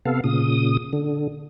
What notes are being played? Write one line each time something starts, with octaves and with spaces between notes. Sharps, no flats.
C3 B3 A4 F5
A#2 C#3 D#6
D3